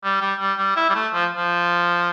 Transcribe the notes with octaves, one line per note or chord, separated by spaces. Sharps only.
G3
G3
G3
G3
E4
G3
A3
F3
F3